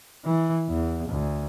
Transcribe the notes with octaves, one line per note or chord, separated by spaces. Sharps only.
E3
E2
D2